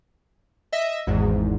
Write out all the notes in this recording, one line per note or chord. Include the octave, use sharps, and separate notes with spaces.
D#5 E5
G#1 E2 G#2